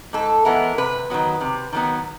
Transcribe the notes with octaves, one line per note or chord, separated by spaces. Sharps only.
G#2 A4
E3 G#3 B3 A#4
C3 B4
D#3 F#3 B3
C3
D#3 F#3 B3